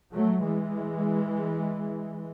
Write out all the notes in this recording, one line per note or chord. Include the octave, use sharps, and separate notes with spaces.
F#3 A3
E3 G#3